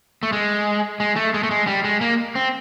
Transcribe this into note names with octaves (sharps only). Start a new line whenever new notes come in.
A3
G#3
G#3
A3
G#3
A3
G#3
G3
G#3
A#3
C4